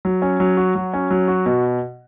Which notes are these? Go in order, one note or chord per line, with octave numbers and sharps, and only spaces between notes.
F#3
C#4
F#3
F#4
F#3
C#4
F#3
F#4
B2